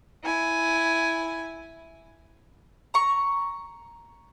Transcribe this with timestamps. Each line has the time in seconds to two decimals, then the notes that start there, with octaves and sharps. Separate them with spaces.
0.23 E4 G#5
2.94 A#5 C#6